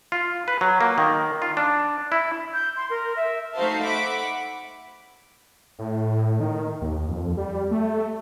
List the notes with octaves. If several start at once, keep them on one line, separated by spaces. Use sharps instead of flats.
F4
B4
F#3
A#3
D#3
F4
D4
E4
G6
C6
A#4
E5
A3 D#4 F#4 C5 F5 A5
E5 F#5 B5 D6
A2
D#3
D#2
F2
G3
A3